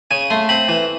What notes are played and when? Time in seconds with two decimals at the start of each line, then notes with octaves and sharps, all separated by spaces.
0.11 C#3 G#5
0.30 A3 C6
0.49 C4 B5
0.68 E3